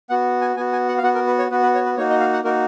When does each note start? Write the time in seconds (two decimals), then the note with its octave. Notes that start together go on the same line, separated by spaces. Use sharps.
0.10 B3 F#4 F#5
0.41 G#5
0.56 B3 G#5
0.59 F#4
0.73 G#5
0.88 F#5
0.97 F5
1.03 B3 F#4 F#5
1.15 A#4
1.27 B4
1.39 C#5
1.51 B3 F#4 B4
1.63 B4
1.75 C#5
1.86 B4
1.97 A#3 D#4 F#4 C#5
2.10 D#5
2.20 F5
2.33 F#5
2.44 A#3 D#4 F#4 A#4